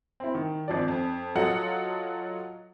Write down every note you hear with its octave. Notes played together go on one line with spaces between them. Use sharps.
C4 E4
D#3
G#1 F3 D5
F2
F#3 F4 A4 D#5 F#5